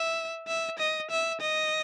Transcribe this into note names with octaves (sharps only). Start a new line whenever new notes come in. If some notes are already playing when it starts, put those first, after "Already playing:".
Already playing: E5
E5
D#5
E5
D#5